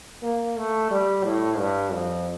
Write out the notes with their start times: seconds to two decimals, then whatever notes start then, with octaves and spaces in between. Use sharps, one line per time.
0.23 A#3
0.57 A3
0.91 G3
1.25 A2
1.58 G2
1.92 F2